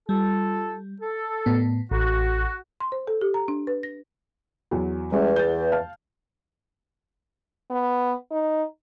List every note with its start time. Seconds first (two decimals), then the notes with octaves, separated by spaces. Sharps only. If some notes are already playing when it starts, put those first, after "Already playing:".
0.09 G3 F4 A4
1.01 A4
1.46 A2 B3
1.91 A1 F#4
2.80 C6
2.92 C5
3.07 A4
3.21 G4
3.34 A#5
3.48 D4
3.67 B4
3.83 A#6
4.71 E2 F#3
5.12 E2 G3 G#3 C#4
5.36 G6 A6
5.72 F5 A5 F6
7.70 B3
8.31 D#4